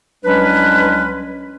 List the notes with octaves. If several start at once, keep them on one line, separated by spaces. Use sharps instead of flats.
C2 F#3 G#3 C#4 D4 B4